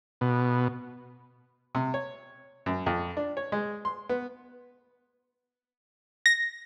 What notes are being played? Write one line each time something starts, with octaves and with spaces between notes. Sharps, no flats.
B2
C3
C#5
F#2
F2
D4
C#5
G#3
C6
B3
A#6